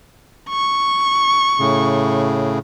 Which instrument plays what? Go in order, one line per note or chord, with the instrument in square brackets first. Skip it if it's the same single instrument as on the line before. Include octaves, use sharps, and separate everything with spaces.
[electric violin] C#6
[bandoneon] A2 C#3